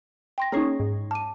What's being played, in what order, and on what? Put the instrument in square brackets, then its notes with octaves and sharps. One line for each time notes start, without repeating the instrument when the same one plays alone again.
[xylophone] G5 C6 A#6
[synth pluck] A#3 C#4 D#4 [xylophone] G#4 C#5 C7
[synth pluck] G#2
[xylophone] A5 D6 D#7